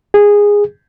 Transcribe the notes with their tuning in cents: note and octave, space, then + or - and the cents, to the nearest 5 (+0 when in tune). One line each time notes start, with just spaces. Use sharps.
G#4 -15